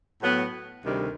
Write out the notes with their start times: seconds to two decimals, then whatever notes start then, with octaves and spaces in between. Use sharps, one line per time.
0.20 A2 F#3 B3
0.84 D2 C3 D#3 G3